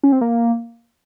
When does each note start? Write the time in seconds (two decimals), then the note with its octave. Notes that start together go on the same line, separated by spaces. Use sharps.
0.03 C#4
0.12 C4
0.21 A#3